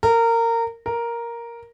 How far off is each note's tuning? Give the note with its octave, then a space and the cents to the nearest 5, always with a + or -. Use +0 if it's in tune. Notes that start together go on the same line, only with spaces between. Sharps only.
A#4 -20
A#4 +5